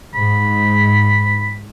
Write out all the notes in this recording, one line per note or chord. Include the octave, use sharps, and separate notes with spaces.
G#2 B5